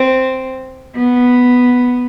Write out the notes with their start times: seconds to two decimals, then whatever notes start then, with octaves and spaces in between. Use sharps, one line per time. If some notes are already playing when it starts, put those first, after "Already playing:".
Already playing: C4
0.97 B3